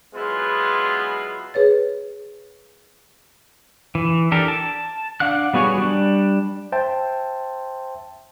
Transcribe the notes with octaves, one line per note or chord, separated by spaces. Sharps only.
F#3 G#3 B3 E4 F4
G#4 B4 C#5 A6
E3
D4 G4 A4 A#4
A5
D4 F5 F#5 F#6
G3 B3 F#4 G#4 C#5
G3 D4
C5 E5 G5 A5 C6